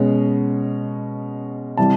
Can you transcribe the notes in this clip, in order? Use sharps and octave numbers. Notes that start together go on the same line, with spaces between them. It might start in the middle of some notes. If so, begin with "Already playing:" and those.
Already playing: B2 G#3 C#4
C3 E3 G3 A5